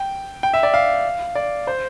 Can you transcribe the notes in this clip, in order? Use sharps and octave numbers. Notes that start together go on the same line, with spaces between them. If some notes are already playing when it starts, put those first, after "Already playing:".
Already playing: G5
G5
E5
D5
F5
D5
C5